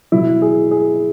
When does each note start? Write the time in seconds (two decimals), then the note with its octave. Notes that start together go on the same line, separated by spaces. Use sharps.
0.12 B2 F#3 E4
0.42 G#4
0.71 G#4